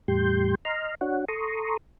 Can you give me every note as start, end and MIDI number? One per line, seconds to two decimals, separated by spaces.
0.08 0.55 40
0.08 0.55 45
0.08 0.55 55
0.08 0.55 67
0.08 0.55 84
0.08 0.55 91
0.65 0.95 75
0.65 0.95 82
0.65 0.95 84
0.65 0.95 89
1.01 1.25 62
1.01 1.25 66
1.01 1.25 73
1.01 1.25 78
1.28 1.77 69
1.28 1.77 82
1.28 1.77 84
1.28 1.77 85
1.28 1.77 87